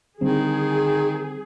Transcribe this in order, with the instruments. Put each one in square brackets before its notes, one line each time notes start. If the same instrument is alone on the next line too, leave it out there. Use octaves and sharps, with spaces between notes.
[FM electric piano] D3 G3 C4 [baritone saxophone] D#3 [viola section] G#4